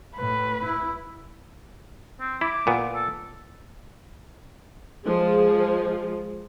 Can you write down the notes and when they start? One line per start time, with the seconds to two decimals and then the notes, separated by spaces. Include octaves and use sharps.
0.17 A2 B4
0.64 E4
2.20 C4
2.41 E4 D6
2.67 A#2 B3
2.95 A4
5.06 F3 G#3 G#4